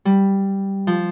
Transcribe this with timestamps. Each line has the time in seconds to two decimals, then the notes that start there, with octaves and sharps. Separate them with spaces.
0.05 G3
0.87 F3